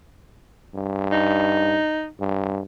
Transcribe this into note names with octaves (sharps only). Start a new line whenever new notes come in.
G2
D#4
G2